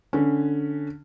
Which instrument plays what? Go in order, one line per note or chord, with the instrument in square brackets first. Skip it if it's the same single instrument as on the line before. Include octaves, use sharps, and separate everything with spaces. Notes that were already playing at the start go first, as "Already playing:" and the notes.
[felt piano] D3 C#4